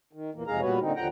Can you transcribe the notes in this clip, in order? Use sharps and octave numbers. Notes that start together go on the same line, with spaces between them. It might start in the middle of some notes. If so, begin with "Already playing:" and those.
D#3
E2 A#2 E3 A#3
F2 C3 G#3 G#4 F5 A#5
A#2 G3 B3 F#4 B4 C#5
A#2 D3 C4 D#4
D#2 D3 F3 F#5 G5 A#5